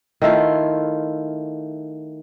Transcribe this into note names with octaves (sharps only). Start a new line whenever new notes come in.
D#3 A3 E4 F4